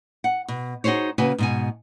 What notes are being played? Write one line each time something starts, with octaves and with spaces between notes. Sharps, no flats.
F#5
B2
D#4 F#4 G#4 C5 C#5
C#3 A#3 F#4 B4 G#5
G#2 B2 G#5